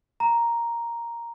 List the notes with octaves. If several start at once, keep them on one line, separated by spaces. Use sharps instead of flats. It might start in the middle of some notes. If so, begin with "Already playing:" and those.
A#5